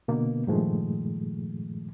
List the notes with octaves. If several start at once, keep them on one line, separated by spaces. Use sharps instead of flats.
B2 D3 A#3 B3
G2 A#2 D#3 F3 G#3 A3